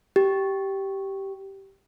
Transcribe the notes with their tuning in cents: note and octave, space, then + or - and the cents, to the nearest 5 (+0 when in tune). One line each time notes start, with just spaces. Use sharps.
G4 -10